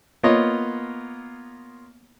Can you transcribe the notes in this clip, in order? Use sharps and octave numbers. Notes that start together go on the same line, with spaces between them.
A#3 B3 F4 C#5 D#5